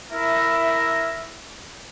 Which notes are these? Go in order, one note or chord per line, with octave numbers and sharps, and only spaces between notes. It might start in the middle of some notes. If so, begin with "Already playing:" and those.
E4 A#4 E5